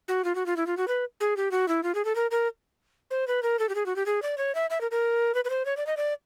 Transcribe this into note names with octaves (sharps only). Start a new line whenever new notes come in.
F#4
F4
F#4
F4
E4
F4
F#4
B4
G#4
G4
F#4
E4
F4
G#4
A4
A#4
A#4
C5
B4
A#4
A4
G4
G#4
F#4
G4
G#4
D5
C#5
E5
E5
A#4
A#4
B4
B4
C5
C#5
D5
D#5
D5